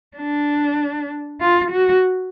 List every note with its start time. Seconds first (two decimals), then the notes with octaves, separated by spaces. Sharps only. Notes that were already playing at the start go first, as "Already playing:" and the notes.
0.17 D4
1.40 F4
1.72 F#4